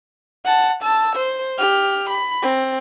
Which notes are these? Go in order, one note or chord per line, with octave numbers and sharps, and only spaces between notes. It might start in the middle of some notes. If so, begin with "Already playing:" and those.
F#5 A5
A5 E6
C5
G4 F6
B5
C4